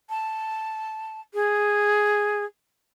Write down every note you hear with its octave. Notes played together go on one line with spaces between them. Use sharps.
A5
G#4